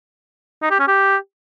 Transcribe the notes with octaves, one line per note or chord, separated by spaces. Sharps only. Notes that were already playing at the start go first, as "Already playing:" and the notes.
D#4
G4
C#4
G4